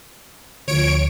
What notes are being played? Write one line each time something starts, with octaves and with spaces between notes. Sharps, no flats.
D2 F3 C#5 D7